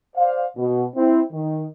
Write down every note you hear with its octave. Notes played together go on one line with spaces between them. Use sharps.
C5 D5 F5
B2
C4 E4
D#3